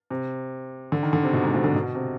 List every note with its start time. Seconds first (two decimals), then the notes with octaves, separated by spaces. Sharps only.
0.10 C3
0.92 D3
1.03 D#3
1.13 D3
1.23 C3
1.33 B2
1.44 G#2
1.54 B2
1.64 D3
1.75 B2
1.95 C3